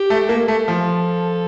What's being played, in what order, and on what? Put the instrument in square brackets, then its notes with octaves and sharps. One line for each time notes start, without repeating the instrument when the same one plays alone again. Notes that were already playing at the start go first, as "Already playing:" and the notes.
Already playing: [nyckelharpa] G4
[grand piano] A3
[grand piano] A#3 [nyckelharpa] A4
[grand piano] A3
F3